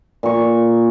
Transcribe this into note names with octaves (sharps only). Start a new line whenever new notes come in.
A#2 C#6